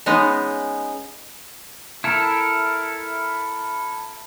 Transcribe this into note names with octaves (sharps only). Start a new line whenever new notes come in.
G#3 B3 C#4 D#4
E4 A4 A#4